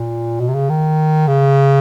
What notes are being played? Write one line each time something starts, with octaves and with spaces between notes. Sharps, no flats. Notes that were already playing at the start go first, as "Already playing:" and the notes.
Already playing: A#2
B2
C3
C#3
D#3
C#3